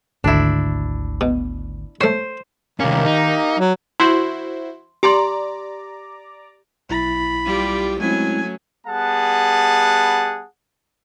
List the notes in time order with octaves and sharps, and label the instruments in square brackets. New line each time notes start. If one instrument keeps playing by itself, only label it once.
[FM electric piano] G#1 D2 [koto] D4 E4
[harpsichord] B2
[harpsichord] A3 C#5 [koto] C5
[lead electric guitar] C2 C#4 [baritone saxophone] D#3 [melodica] A#3 G4 A#4
[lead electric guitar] D#4
[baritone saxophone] F#3
[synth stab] E4 F#4 C5 [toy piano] C6
[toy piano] G4 C6 [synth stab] D5 A#5 D6
[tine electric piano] B1 E4 A6 [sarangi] B5
[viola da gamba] G3 F4 G4
[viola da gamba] F#3 A3 C#4 [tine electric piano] G#3 C4 E4 [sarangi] G#5
[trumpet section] G3 B3 G#4 F#5 A5